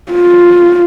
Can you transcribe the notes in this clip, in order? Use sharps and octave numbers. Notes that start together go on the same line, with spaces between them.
F4